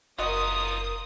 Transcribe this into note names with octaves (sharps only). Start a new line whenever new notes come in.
F#1 D#4 F4 F#4 A#4 D#5 D#6